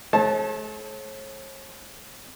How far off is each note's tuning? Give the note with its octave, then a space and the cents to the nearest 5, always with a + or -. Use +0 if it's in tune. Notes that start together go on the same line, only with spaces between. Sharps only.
A3 -45 C#5 -45 A5 +0